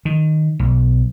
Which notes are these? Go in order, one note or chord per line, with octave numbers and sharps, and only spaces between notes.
D#3
B1